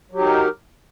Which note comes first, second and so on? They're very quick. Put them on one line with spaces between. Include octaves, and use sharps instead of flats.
F#3 G4 D#4 A#4